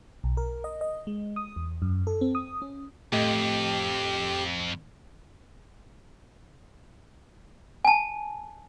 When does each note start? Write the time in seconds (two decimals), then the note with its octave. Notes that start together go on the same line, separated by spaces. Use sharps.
0.24 B1
0.37 A#4
0.64 D#5
0.81 D#5
1.07 G#3
1.36 D#6
1.56 E2
1.82 F#2
2.07 A4
2.21 C4
2.35 D#6
2.62 C#4
3.12 F2 A2 A3 G4 D#5
7.85 G#5 A5